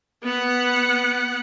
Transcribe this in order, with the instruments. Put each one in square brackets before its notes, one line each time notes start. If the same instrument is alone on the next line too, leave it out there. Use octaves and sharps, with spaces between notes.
[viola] B3 F#5